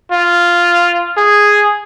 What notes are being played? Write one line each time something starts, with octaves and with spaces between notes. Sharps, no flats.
F4
G#4